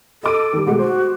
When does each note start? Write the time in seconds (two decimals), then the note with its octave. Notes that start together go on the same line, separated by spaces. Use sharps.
0.23 A4 D#5 D6 D#7
0.53 D#3 G3
0.66 B2 G#3 A3 F#5
0.79 F#4 C5